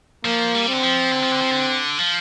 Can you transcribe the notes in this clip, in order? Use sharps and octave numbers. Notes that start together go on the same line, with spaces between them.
F3 A#3
G3
C4
D3
F3
D3
F3
D3
F3
D3
F3